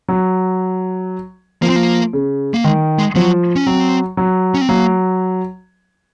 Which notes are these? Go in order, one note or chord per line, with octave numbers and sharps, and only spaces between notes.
F#3
F3 A#3
C4
A#3
C#3
A#3
D#3 G#3
G#3
F3 F#3
C#4
F#3 C4
F#3
C#4
C4
F#3 A#3